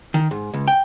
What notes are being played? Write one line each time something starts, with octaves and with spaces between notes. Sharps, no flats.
D#3
G#2
C#2
G5